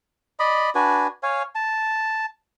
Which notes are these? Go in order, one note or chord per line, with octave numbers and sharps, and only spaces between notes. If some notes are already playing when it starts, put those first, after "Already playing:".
D5 D#5 B5
D4 F#4 B4 G#5
C#5 F5 G#5
A5